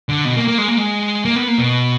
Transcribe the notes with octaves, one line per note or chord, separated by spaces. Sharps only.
D3
B2
A#3
A#3
G#3
A#3
G#3
A#3
B3
A#3
B2